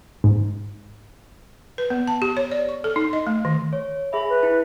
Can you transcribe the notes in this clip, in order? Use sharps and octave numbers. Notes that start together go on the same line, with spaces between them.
G#2
B4
B3
A5
G4
C#5
D5
C#6
A4
D#4
D#5
A3
D#3
C#5
G#4 E5 B5
B4
E4